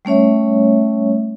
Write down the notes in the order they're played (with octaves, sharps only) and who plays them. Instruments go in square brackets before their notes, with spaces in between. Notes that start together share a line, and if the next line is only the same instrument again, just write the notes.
[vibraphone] G3 A3 C#4 C#5 E5